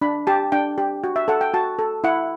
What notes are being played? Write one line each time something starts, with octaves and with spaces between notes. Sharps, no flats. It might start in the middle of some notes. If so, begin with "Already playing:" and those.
D4 B5
G4 A5
D4 G5
G4
F#4
E5
A4 F#5
G5
F#4 A5
A4
E4 F#5